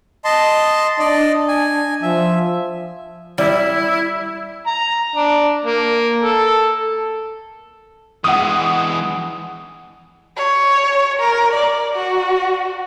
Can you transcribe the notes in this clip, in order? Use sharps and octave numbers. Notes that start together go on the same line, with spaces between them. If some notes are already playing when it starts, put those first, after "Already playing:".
D#5 A5 C6
D4 D5 D#5
G#5
F3 E5
G3 E4
A#5
D4
A#3
A4
E3 G#3 F#5 D#6
C#5
A#4
D5
F#4